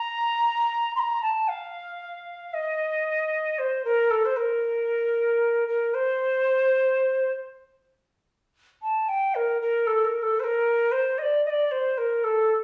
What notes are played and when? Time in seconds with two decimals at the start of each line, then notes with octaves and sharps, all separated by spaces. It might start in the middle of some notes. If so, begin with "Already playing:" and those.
Already playing: A#5
0.95 C6
0.99 A#5
1.22 A5
1.48 F5
2.53 D#5
3.58 C5
3.84 A#4
4.10 A4
4.25 C5
4.36 A#4
5.68 A#4
5.94 C5
8.82 A5
9.08 G5
9.34 A#4
9.61 A#4
9.86 A4
10.04 A#4
10.22 A4
10.39 C5
10.43 A#4
10.91 C5
11.18 D#5
11.22 D5
11.45 D#5
11.49 D5
11.71 C5
11.97 A#4
12.23 A4